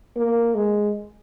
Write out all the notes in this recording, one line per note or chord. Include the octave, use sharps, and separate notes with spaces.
A#3
G#3